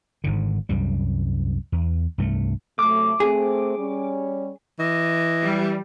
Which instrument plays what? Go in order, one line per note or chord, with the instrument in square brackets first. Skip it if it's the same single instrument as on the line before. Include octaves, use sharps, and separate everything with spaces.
[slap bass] G#1 G#2 D3
C2 F#2 G3
E2
C2 G2 G#3 A3
[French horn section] C3 F#3 A3 [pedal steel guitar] D6
[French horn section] A3 C4 [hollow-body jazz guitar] G#4
[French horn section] G3 C#4
[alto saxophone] E3 [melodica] D#5
[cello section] G3